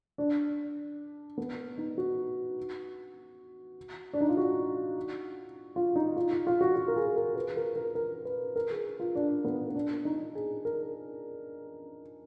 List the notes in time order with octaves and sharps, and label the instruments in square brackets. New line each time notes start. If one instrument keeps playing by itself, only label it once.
[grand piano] D4
B3
D#4
F#4
D4
D#4
F4
F#4
F4
D#4
F4
F4
F4
F#4
F#4
A#4
G#4
A#4
B4
A#4
A#4
A#4
B4
A#4
G#4
F4
D4
B3
B3
D4
D#4
G#4
A#4